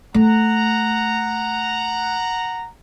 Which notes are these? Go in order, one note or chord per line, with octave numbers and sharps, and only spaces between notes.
A3 F#5 A#5